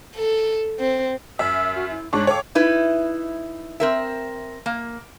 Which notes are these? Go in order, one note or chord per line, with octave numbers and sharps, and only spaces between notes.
A4
C4
F#2 E5 E6 F6
F#4 F6
E4
G#2 D4 C#5 C#6 D6 F#6
A4 C#5 F5 G5 D6
D#4 E4 B4
C4 A#4 E5
A#3